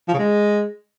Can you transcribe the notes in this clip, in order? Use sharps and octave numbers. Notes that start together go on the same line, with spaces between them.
F3
C#3
G#3